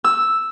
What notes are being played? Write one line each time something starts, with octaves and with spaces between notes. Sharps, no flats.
E6